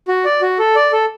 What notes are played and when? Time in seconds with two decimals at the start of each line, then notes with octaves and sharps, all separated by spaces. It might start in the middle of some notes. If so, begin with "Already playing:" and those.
0.08 F#4
0.25 D5
0.42 F#4
0.59 A4
0.75 D5
0.93 A4